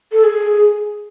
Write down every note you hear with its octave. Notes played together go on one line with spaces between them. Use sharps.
A4
G#4